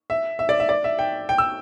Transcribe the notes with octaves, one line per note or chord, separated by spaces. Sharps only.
E5
E5
D5
E5
D5
E5
G5
G5
E6